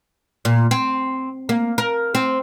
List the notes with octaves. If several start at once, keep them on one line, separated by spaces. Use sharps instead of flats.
A#2
C4
A#3
A#4
C4